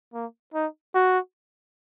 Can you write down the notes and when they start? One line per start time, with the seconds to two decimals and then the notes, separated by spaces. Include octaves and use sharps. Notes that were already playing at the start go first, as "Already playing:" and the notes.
0.14 A#3
0.54 D#4
0.95 F#4